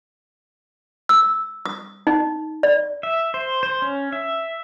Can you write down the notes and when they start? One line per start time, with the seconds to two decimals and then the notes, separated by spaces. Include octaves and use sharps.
1.09 E6
1.66 D#6
2.07 D#4
2.63 D5
3.03 E5
3.34 C5
3.63 C5
3.82 C#4
4.12 E5